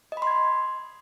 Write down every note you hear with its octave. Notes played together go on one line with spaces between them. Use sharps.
D#5
B5
C6
G#6